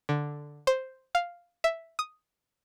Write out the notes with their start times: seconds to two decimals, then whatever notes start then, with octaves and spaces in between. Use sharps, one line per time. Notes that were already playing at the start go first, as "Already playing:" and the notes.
0.09 D3
0.67 C5
1.15 F5
1.64 E5
1.99 D#6